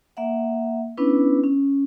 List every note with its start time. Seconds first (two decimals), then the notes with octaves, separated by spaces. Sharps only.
0.17 A#3 E5 F#5
0.97 B3 C#4 D4 E4 B4
1.44 C#4